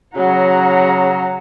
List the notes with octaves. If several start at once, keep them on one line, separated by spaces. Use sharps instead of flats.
C#3 F#3 F#5 A#5